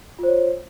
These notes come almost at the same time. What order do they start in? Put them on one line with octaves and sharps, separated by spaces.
F4 C5 C#5